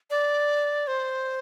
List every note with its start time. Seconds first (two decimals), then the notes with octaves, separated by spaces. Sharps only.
0.10 D5
0.87 C5